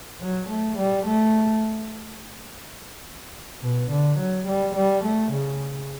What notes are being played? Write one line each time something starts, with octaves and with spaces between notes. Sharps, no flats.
F#3
A3
G3
A3
B2
D3
F#3
G3
G3
A3
C#3